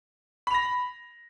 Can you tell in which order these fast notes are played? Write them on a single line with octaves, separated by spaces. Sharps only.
B5 F7 A#6